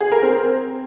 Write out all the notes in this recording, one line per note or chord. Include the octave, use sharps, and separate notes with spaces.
G#4
A#4
C4